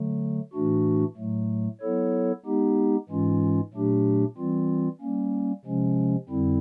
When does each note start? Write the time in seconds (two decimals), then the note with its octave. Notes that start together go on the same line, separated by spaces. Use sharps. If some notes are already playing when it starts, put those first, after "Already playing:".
Already playing: D3 F#3 A3
0.53 A2 E3 A3 D4 F#4
1.17 A2 F#3 A3
1.81 F#3 B3 E4 A4 C#5
2.45 G#3 B3 D#4 G4
3.09 G#2 E3 G#3 C#4 F4
3.73 A#2 F#3 A3 D4 G4
4.37 E3 G3 C4 F4
5.01 G3 A#3 C#4
5.65 C3 F3 G#3 C#4
6.29 F2 D3 G3 C4 E4